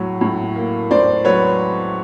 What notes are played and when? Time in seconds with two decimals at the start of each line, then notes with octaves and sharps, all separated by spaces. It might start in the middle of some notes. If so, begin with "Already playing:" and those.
Already playing: A2 F#3
0.21 A2
0.56 A#3
0.91 A2 C5 D5
1.25 F#3 B4 C#5